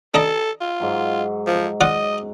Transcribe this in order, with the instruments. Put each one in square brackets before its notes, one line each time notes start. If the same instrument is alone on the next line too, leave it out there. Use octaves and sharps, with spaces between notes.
[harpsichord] D4 D#5 A#5 [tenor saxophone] A4
[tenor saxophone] F4
[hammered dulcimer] G#2 F#3
[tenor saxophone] F3
[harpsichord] F4 D5 F#5 [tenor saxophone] D#5